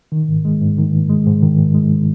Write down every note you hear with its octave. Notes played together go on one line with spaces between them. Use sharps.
D#3
G#2
G#3
G#2
D#3
G#2
G#3
G#2
D#3
G#2
G#3